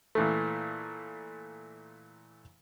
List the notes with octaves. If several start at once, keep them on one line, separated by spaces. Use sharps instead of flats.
A#2 E3 A3